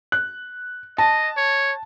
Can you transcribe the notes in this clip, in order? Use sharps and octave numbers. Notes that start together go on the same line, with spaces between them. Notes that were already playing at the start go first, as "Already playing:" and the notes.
F#6
D#5 A5
C#5